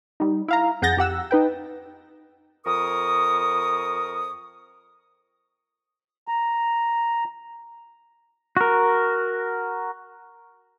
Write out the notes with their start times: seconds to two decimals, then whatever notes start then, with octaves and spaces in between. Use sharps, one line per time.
0.20 G3 D#4
0.48 E4 F5 A#5
0.82 F2 G#4 F#5 G6 A6 A#6
0.97 F2 G4 F#5 E6
1.31 D#4 B4 G5
2.66 F2 A#4 C#6 D#6
6.28 A#5
8.57 F#4 A#4